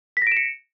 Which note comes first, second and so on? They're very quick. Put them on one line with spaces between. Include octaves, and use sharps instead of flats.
B6 A#6 D7 E7 C#7